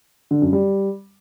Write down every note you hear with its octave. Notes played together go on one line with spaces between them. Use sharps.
D3
F#2
G3